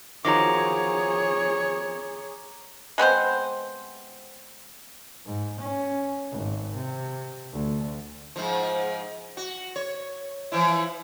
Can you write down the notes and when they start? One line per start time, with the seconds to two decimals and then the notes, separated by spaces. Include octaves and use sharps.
0.25 D#3 F3 F#3 G#4 C#5 A#5 D6
2.98 G#3 B3 C4 C5
5.26 G#2
5.61 C#4
6.32 G#1
6.76 C3
7.53 D2
8.36 G#2 F3
9.37 F#4
9.76 C#5
10.52 E3 F3 E4